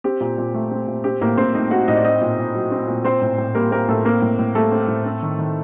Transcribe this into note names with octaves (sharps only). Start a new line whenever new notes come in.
C4 G4
A#2
A#2
A3
C4
A#2
C4 G4
A2 A#3 A#4
A2 C4 C5
A3 D#4 D#5
C4 F#4 F#5
A2 D#4 D#5
D5
C4 D#4 D#5
A#2
A#2
F#3
C4
A#2
C4 C5
A2
A2
G3 A#3 A#4
A#3 C4 A#4
A2 A3 A4
A#3 C4 A#4
A2
A2
G3 A3 A4
C4
A2
C4
D#3
D#3